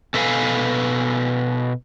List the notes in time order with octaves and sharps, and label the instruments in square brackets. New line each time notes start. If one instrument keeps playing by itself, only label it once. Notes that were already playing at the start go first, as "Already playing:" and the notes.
[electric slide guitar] B2 A4 B4 C5 F5 G#5